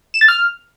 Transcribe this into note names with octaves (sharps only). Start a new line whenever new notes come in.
E7
A6
F6